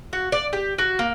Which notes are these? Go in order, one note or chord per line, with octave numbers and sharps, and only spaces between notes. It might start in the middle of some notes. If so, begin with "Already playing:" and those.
F#4
D5
G4
F#4
A#3